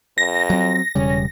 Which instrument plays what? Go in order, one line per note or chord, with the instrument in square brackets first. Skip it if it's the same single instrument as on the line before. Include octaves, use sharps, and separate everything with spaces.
[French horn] F2 [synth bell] A#6
[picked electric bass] F#3 C4
[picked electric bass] E1 C#3 G3 [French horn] C#4